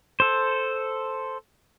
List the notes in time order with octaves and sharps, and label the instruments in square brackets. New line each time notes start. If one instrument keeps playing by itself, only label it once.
[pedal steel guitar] A4 C5